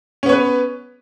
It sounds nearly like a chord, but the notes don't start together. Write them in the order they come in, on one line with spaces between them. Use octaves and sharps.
C#4 B3 C#5 B4